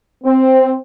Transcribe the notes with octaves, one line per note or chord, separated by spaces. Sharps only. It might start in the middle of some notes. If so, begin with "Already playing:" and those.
C4